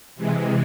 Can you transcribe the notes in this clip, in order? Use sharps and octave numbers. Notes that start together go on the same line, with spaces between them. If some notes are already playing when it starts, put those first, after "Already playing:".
C3 E3 G#3